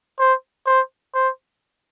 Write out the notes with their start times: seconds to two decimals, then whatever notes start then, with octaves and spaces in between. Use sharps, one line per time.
0.19 C5
0.66 C5
1.15 C5